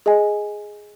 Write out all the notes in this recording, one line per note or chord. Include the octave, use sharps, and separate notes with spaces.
G#4 D#5 G#5